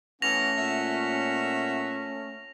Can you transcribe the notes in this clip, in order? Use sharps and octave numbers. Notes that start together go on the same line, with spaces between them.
E3 A3 B3 C#4 F#4 A#6 F7
A#2 E5 F#5